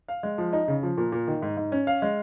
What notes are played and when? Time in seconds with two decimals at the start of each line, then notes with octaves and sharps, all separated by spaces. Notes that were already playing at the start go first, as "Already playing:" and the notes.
0.08 F5
0.23 G#3
0.38 F3
0.53 D#4
0.68 C#3
0.83 F3
0.98 A#2
1.12 A#2
1.27 D#3
1.42 G#2
1.57 G#2
1.72 C#4
1.87 F5
2.02 G#3